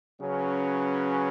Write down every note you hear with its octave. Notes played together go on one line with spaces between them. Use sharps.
C#3 F#3 C#4 B4